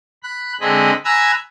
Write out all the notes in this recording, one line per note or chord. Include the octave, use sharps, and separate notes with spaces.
B5 F#6
D3 G#3 C4 G#4 D#5 B5
G#5 A#5 B5 E6 F#6 G#6